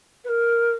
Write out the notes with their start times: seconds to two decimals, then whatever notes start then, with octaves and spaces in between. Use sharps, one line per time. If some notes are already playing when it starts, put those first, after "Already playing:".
0.24 B4
0.28 A#4